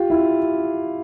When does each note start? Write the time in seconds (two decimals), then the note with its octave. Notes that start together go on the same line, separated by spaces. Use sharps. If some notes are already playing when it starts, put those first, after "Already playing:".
Already playing: F4 G4
0.10 E4